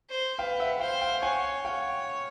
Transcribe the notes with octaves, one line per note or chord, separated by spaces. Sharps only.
C5
B4 F5 G5
E5 F#5
C5 F5 G5
F5 G5
C#5 F#5 G#5
F5 G5